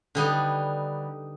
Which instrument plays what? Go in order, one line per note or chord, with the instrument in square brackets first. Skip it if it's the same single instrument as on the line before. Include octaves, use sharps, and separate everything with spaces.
[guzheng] D3 G3 B3 D#4